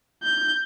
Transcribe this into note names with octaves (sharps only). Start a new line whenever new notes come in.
G6